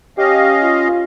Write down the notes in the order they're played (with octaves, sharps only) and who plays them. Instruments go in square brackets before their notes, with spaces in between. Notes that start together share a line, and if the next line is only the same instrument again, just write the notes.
[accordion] C#4 D#5 F5 [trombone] G4
[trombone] F4